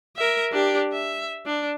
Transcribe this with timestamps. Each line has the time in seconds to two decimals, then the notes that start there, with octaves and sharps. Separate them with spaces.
0.16 A#4 E5
0.52 D4 G4
0.92 E5
1.46 D4